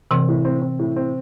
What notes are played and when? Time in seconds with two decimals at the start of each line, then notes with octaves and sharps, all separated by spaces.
0.11 C3 E3 C4
0.28 A2
0.45 C4
0.62 C4
0.79 A2
0.96 C4